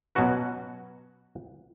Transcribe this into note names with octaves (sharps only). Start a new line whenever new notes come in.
B2 F#3 C#4 F#4 B4